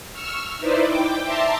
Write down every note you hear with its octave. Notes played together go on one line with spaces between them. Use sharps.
C#6 E6 F6
D#4 E4 B4 C5 D5
G5 D6
E5 A5 A#5 C6 D6